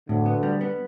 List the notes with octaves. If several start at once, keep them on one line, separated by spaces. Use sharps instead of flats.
D2 A2 D3
B3
G3
B3